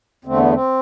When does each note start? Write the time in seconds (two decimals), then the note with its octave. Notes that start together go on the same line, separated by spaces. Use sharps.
0.25 E2 D3 A3 C4
0.38 B3
0.52 C4